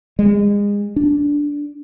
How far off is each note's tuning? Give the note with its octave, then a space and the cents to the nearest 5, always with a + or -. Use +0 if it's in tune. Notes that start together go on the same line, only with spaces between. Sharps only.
G#3 -30
D4 -10